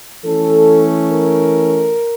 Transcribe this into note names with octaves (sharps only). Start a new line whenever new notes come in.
E3 A3 C#4 A4
A#4